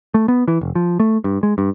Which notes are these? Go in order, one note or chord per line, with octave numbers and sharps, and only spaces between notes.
A3
B3
E3
F1
F3
A3
G2
G#3
G2